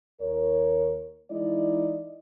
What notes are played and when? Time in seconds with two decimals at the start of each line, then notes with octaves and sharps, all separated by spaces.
0.20 D#2 A#4 C#5
1.30 E3 G#3 D#4 E4 D5 D#5